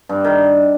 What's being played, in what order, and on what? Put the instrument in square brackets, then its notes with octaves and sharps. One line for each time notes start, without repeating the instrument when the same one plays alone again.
[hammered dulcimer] G2
D#3